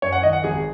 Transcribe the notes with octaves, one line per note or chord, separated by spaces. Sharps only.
F#2 C#5
F#5
D#3 D#5
F#5
G#1 G#4